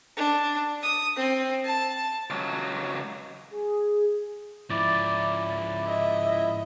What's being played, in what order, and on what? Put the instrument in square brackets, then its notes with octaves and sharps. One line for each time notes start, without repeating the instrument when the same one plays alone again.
[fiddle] D4
D#6
C4
A5
[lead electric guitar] C#2 F#3
[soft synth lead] G#4
[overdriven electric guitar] G#2 F3 [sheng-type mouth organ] E4 [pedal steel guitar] D5
[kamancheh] D#5 E5